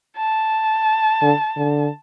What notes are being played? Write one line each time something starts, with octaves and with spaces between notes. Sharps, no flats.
A5
D3
D3